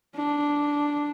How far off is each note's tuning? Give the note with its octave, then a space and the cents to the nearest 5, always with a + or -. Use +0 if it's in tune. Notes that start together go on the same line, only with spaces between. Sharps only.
D4 -5